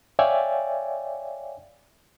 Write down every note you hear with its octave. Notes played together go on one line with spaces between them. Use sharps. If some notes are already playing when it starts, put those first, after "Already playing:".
C#5 D5 E5 F5 G5 G#5